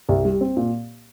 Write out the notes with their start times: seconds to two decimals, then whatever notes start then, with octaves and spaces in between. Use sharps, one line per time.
0.09 C2
0.25 G3
0.41 C4
0.57 A#2